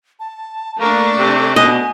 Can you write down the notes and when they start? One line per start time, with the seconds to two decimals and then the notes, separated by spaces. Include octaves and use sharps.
0.20 A5
0.80 A3 A#3 D4 C#6
1.19 C3
1.56 B2 D#5 G#5